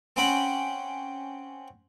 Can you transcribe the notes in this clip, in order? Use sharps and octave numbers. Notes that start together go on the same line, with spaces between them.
C4 C#4 F#5 G5 B5